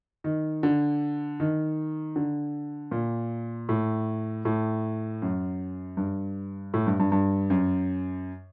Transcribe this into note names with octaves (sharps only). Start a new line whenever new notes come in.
D#3
D3
D#3
D3
A#2
A2
A2
F#2
G2
A2
G2
G2
G2
F#2